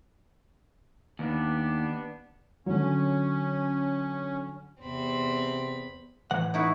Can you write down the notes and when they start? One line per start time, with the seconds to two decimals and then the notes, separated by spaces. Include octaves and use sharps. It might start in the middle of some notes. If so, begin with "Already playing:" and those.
1.19 D#2 B3 D4 G4
2.66 D3 F#3 C#4
4.82 E2 C3 C4 B5
6.31 A2 E3 F#5
6.54 D#4 E4 F#4